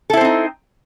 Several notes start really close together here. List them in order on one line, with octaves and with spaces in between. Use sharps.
A4 E4 C5 C4 D#4